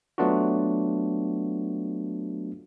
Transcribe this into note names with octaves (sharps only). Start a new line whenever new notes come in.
F#3 A3 B3 D4 F4 F#4